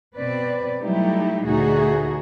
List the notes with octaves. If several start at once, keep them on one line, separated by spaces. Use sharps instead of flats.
B2 C4 B4 D5
F#3 G3 A3 D#4 E4 G4
D2 A#2 A3 D#4 F#4 G#4